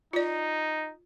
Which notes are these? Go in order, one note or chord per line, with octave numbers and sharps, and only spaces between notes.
D#4 F4 D5